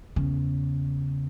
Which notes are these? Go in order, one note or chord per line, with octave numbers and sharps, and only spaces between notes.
E2 C#3